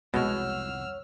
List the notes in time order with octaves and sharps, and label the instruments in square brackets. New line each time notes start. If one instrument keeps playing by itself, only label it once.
[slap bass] C2 F2 [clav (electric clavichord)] B2 G#3 [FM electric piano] C#5 F#5 [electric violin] E6 F6